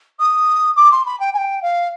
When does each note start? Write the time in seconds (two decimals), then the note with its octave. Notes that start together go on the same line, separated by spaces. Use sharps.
0.19 D#6
0.76 D6
0.91 C6
1.05 B5
1.19 G5
1.34 G#5
1.37 G5
1.62 F5